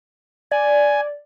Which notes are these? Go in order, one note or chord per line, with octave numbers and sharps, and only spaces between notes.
D5 G#5